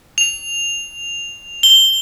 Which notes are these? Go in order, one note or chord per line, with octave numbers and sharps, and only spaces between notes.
F7
G7